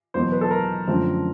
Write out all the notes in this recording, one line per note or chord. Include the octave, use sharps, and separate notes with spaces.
E2 B2 F#3 A#3 C5
B4
A4
A#4
F#2 D3 F3 A3 C4